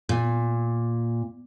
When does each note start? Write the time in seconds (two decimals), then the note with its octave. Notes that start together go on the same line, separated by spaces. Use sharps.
0.09 A#2